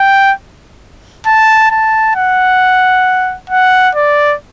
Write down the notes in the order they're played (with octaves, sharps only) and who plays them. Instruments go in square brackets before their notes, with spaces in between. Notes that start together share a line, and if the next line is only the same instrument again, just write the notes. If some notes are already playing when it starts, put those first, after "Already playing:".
Already playing: [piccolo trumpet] G5
A5
A5
F#5
F#5
D5